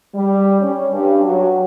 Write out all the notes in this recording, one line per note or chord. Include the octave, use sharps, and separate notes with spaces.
G3
C#4
G2
F#3